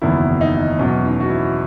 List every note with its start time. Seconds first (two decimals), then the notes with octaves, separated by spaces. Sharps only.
0.01 F#1 E2 D#3 E4
0.41 D#4
0.79 E2 B2 F#3 C#4
1.05 D#4
1.20 F#4
1.30 E4